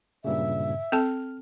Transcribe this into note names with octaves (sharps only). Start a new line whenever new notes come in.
G2 A#2 C#3 E5
C4 A4 A5 F6